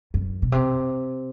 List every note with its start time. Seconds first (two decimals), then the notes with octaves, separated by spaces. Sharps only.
0.14 F#2
0.42 B2
0.52 C3